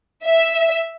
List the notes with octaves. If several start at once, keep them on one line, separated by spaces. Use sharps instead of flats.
E5